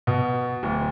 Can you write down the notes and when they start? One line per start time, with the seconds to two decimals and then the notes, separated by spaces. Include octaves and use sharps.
0.07 B2
0.63 D1